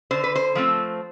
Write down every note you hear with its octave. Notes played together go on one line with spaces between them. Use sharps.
D3 C5
B4
C5
F3 A3 C4